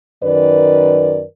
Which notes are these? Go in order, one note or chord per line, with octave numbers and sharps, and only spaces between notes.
F#2 D#3 A#4 B4 D5